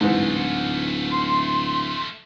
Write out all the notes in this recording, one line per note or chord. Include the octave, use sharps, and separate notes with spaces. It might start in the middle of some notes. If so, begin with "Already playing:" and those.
D1 G#2 E3 A3 F4
C6